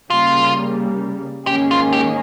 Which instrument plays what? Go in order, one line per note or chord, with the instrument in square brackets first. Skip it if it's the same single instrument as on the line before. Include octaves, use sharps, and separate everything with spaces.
[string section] C#3 G3 A#3 [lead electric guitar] F4
[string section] G#2 D#3 A#3 C#4 G#4 [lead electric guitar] G4
[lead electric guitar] F4
G4